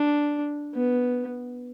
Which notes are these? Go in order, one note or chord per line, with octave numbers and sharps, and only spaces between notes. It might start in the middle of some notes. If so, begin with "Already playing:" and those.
Already playing: D4
B3